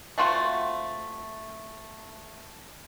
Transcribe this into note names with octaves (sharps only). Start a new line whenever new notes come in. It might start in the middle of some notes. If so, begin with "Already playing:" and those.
A3 C4 F4 F#4